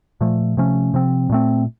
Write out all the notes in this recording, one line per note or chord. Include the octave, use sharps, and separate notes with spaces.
A#2 F3 A3
C3 F3 A3 C#4
C3 F3 C4
A#2 A3 C4